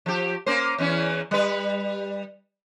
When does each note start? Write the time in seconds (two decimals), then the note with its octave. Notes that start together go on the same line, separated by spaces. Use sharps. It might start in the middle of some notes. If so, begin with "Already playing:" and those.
0.06 F3 G4
0.46 A#3 C#4 C5
0.78 E2 E3 C#4
1.31 G3 B4